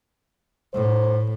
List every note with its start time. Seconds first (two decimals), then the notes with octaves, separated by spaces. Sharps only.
0.74 A2 C5